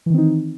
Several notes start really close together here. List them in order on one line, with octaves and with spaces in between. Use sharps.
E3 D#3 C4 D#4